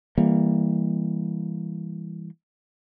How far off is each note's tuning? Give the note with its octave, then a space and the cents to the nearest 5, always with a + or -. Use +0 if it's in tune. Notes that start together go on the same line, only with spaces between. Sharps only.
E3 +0 G3 +25 A#3 +0